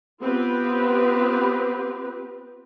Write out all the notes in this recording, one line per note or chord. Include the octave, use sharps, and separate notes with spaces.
B3 C4 F4 G4 B4